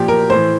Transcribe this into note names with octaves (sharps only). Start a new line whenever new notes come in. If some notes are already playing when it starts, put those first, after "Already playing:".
Already playing: A#2 F3 G4
A#4
A2 E3 C5